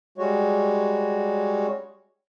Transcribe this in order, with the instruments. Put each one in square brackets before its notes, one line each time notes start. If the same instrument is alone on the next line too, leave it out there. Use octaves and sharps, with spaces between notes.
[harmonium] G3 G#3 F#4 C#5